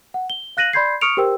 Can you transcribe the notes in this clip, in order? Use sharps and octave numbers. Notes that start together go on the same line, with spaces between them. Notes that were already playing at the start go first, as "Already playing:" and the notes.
F#5
G7
F5 F#6 A#6 D#7 F#7
D5 B5 C6 G6 G#6 C7
C#6 D#6 F6 C#7 D7 F7
G4 A#4 C5 G5 E6